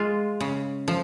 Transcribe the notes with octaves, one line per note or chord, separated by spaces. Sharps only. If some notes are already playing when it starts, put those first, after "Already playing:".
Already playing: G#3 F4
C#3
F3